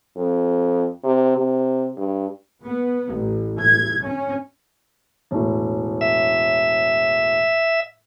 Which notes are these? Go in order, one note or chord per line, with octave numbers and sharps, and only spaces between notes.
F2
C3
C3
G2
B3
A1
G#6
C#4
E1 A2
E5